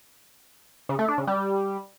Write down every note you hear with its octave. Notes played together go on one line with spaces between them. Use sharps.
C#3
A3
D4
C#3
G3